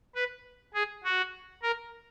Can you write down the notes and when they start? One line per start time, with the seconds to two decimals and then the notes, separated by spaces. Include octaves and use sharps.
0.15 B4
0.74 G#4
1.04 F#4
1.63 A#4